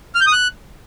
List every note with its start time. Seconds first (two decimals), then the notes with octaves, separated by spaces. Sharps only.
0.15 F6
0.21 G6
0.27 D#6
0.33 F#6